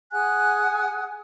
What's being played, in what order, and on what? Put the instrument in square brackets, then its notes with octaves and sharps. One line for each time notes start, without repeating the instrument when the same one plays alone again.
[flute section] G#4 F#5 G#5 F#6